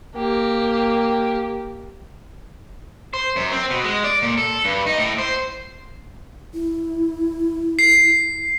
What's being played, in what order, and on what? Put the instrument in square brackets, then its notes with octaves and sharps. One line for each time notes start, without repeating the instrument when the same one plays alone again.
[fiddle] A#3 G4
[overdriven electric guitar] C5
F#2
C4
B2
G#3
D5
A#2
A4
G2
D#4
A2
C5
[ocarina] E4
[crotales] C7